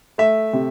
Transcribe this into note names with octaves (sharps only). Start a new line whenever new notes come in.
A3 E5
C3